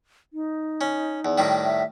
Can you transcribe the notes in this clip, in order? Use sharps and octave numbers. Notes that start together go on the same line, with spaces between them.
D#4
C#4
E2
A2 D#3 G3
E5